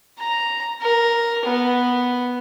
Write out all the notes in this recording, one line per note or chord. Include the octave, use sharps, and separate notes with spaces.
A#5
A#4
B3